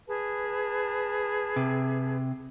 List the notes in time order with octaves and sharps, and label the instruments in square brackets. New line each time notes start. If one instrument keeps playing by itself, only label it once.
[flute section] G#4 B4 A5
[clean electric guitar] C3